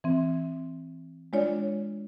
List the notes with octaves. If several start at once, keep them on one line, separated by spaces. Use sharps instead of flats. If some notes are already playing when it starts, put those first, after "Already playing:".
E3 C4
G#3 D4 F4 C#5 D5